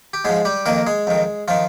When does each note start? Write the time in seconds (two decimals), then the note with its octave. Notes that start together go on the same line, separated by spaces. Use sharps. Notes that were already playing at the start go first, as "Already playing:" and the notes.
0.14 G4
0.25 G#2 F3 G#3 G#4
0.45 G3 G4
0.66 F2 D#3 A#3 A#4
0.87 G#3 G#4
1.07 F2 D#3
1.48 D#3 F3 F4